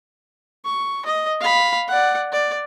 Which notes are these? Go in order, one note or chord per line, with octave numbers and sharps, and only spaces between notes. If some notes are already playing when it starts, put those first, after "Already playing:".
C#6
D#5
F5 B5
D5 F#5
D5